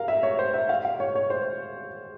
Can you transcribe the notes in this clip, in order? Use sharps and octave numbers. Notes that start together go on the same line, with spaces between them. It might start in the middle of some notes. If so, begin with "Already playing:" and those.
Already playing: A#4 F5
E5
C#5
C5
E5
F5
F5
C#5
C#5
C5